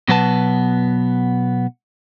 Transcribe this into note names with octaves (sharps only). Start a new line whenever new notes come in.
B2 F#3 B3 B4 A5